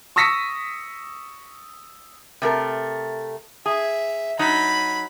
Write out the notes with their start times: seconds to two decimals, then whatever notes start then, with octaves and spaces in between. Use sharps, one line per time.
0.16 C#6 D#6 E6 A#6 B6 C#7
2.42 C3 A3 A#4
3.66 G#4 E5
4.39 F#3 D#4 B5